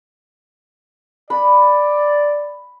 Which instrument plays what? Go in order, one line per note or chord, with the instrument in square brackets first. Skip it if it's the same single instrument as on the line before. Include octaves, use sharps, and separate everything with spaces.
[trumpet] D5 [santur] B5